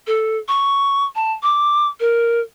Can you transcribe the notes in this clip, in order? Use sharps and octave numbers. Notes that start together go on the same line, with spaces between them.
A4
C#6
A5
D6
A#4